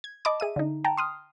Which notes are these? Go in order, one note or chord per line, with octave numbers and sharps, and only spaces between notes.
G#6
D#5 A5 B5 D6
G#4 E5 D#7
D3 D#4
G5 A5 A#5
C6 D#6 F6